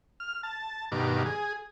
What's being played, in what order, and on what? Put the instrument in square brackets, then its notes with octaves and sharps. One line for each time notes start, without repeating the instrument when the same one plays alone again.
[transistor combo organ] F6
A5
G2 B2 D#3 D6
G#4